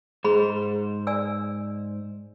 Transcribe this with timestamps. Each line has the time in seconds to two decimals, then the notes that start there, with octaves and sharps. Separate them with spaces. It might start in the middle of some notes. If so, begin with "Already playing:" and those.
0.25 G#2 G#4 C5 B5
1.07 D5 G#5 E6